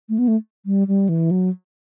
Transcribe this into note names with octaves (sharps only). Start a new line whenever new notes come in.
A3
B3
A3
G3
G3
E3
F#3